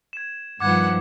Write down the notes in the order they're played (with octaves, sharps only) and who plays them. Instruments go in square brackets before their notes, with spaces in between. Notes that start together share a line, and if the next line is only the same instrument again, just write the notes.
[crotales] G#6 E7
[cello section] G2 D#3 F3 [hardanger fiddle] B3 F#5 [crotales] D6 G#6